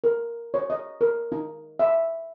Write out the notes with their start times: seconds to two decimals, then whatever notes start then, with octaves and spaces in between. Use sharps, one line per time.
0.04 A#4
0.54 C#5
0.70 D#5
1.01 A#4
1.32 D#4
1.79 E5